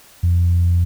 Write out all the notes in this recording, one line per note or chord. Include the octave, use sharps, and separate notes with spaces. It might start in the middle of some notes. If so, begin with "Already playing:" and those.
F2